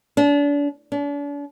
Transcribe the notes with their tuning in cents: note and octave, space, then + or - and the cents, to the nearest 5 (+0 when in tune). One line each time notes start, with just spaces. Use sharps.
D4 -35
D4 -40